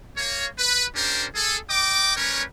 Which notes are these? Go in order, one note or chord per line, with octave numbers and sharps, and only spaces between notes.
A#3 C#5
B4
C#4 D4 G4 A#4 C5
G#4 A4
D#5 G5 D6
G3 C#4 A#4 B4 C#5